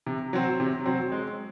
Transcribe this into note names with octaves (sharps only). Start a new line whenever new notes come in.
C3
F#3 C4
C3
F#3 C4
G#3